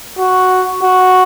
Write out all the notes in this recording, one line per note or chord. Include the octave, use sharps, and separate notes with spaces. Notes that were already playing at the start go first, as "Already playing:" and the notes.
F#4
F#4